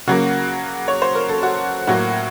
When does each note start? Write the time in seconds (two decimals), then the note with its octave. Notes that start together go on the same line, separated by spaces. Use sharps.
0.07 C#3 F#3 A#3 F#4
0.88 C#5
1.02 C5
1.15 A#4
1.29 A4
1.43 F#4
1.87 A2 F#3 A#3 F#4